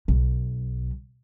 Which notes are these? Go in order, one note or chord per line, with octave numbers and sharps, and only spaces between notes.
B1